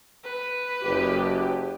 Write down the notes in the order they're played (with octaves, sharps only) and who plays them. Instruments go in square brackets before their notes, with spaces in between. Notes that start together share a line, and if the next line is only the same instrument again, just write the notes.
[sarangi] B4
[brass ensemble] F#1 [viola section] G4